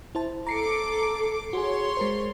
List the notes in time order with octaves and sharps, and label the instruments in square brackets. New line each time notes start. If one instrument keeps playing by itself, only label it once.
[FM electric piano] E4 C5 A5
[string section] A4 D6 [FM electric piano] A#5 C7 C#7
[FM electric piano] F#4 G#4 [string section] C#5 C6
[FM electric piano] G#3 A#4 C5